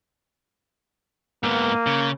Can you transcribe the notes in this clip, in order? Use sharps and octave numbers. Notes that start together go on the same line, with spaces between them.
G#2 A#3 B3
C#3